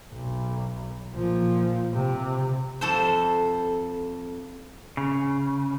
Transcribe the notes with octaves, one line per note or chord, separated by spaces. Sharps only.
B1
A#2 F3
C3
F2 A4 C5
C#3